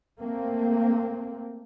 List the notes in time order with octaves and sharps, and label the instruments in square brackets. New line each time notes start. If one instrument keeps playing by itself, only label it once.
[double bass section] A3 A#3 C4